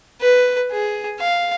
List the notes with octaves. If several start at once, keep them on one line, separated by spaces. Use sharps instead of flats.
B4
G#4
F5